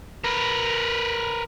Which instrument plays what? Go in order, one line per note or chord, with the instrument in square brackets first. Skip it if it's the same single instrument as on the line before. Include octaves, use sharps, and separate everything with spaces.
[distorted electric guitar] A#4 B4